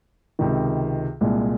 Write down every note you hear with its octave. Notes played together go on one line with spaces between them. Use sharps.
C#2 C3 D#3
C2 A#2 G#3